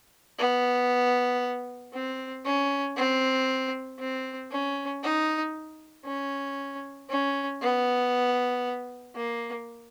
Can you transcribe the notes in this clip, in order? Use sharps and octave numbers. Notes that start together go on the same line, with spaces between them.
B3
C4
C#4
C4
C4
C#4
D#4
C#4
C#4
B3
A#3